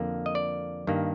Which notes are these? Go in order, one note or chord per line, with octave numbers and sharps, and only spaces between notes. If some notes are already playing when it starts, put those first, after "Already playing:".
Already playing: F2 D3 F3 A#3
D#5
D5
G2 D#3 A#3